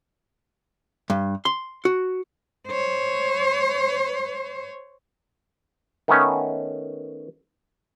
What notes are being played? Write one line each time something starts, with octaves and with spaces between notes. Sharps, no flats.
G2
C6
F#4
C5 C#5
D#3 A3 B3 C#4